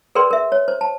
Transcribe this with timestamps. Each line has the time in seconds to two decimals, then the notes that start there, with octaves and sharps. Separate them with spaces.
0.15 G#4 A#4 B4 D5 G5 C6
0.31 A#4 E5
0.52 C#5
0.68 C5
0.81 A5